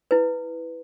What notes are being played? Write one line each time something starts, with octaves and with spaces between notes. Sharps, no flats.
E4 B4